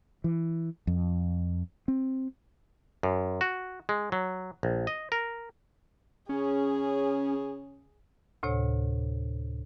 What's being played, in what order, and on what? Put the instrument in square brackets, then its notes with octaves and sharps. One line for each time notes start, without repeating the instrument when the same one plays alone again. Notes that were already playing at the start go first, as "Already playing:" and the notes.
[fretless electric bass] E3
F2
C4
[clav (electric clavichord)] F#2
F#4
G#3
F#3
A#1
D#5
A#4
[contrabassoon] C#3 [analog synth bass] C#4 [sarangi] G#4
[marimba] D2 A2 C3 C#5